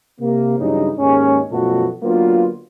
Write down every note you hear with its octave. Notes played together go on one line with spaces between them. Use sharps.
C3 A#3
G2 C#3 E3 F#3 D#4
D#2 G#2 G#3 C#4
F#2 B2 F3 A3 F#4 A4
D3 F#3 A#3 B3 F4